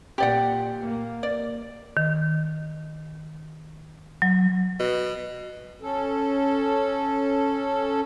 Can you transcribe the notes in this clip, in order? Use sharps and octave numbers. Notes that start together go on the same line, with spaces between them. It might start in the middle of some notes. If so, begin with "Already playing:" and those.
A#2 G4 D5 F#5
A#3
D5
D#3
F#3
B2
C#4 A4